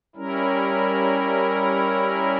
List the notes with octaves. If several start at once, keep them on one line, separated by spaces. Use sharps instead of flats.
G3 C#4 E4 A#4